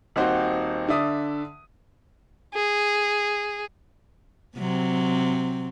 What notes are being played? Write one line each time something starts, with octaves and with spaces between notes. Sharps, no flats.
D#1 C4 D#4 F#4 C5
D3 D5 E5 D#6
G#4
C3 F#3 C4